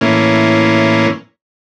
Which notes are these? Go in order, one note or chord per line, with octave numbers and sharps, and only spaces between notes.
A2 E3 A#3 C#4